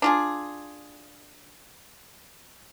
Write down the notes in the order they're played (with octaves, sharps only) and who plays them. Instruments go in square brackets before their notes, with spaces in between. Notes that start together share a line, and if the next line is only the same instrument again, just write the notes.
[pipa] D4 F4 G#4